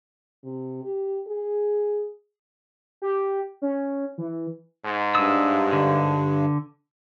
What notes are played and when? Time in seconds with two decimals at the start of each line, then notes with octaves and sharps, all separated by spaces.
0.44 C3
0.84 G4
1.27 G#4
3.02 G4
3.62 C#4
4.18 E3
4.85 G#2
5.15 G2 D#6 E6
5.73 D3